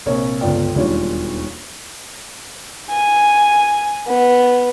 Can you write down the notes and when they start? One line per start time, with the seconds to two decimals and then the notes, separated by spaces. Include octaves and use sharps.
0.06 A#1 C3 A#4 C#5
0.41 G1 C#2 B3 F4 D5 G5
0.75 E1 D#2 G3 D4 F4 C#5
2.91 G#5
4.07 B3